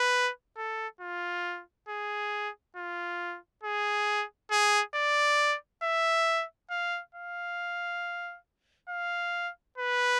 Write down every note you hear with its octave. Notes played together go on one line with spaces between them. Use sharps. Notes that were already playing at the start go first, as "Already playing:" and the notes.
Already playing: B4
A4
F4
G#4
F4
G#4
G#4
D5
E5
F5
F5
F5
B4